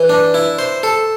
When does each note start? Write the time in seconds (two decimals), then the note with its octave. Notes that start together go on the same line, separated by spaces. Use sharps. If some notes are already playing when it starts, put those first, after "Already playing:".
Already playing: E3
0.09 D4
0.34 E4
0.59 C5
0.83 A4